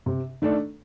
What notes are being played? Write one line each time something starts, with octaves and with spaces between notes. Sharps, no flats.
C3
D#3 A3 D4 A4